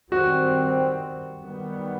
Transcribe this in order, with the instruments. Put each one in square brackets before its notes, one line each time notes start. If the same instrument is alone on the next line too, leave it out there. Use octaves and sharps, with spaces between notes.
[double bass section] D#3 G3 C4 [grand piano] F#4
[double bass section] D#3 G3 B3